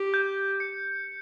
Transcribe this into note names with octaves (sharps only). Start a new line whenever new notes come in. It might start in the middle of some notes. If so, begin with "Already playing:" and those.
Already playing: G4
G6
C#7